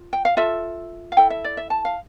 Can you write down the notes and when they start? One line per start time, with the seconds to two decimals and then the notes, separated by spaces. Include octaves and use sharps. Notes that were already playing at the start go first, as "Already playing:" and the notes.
Already playing: F4
0.13 G5
0.25 F5
0.37 F4 A4 E5
1.12 F5
1.17 E4 A4 G5
1.30 E5
1.44 D5
1.57 E5
1.70 A5
1.85 F5